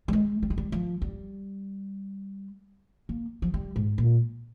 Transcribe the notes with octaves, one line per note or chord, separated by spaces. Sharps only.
G3
G#3
G3
G#3
G3
F3
G3
A#3
F3
G3
G#2
A#2